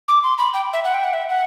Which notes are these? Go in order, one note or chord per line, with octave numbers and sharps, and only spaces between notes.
D6
C6
B5
G5
E5
F#5
G5
F#5
E5
F#5